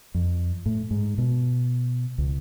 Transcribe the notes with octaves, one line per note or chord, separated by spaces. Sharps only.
F2
A2
G#2
B2
C#2